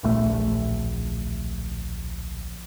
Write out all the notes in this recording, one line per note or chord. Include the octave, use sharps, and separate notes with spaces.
D1 A#1 A3